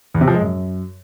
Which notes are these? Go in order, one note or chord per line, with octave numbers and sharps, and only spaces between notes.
E2
C3
F3
G#3
F#2